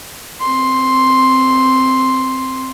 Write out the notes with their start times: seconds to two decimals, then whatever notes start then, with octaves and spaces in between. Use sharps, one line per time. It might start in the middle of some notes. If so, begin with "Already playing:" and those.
0.41 C4 C6